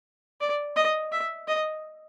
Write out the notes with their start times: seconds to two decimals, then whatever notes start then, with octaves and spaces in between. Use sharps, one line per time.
0.41 D5
0.76 D#5
1.12 E5
1.48 D#5